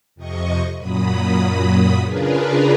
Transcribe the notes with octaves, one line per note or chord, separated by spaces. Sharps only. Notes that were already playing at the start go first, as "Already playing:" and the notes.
F2 C3 D#5 C#6
F#2 A#2 F#3 B5 D#6
C#3 D4 F4 G#4 A#4 B4